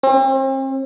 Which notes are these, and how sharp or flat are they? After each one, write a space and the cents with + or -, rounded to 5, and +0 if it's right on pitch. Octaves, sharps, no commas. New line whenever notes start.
C4 +40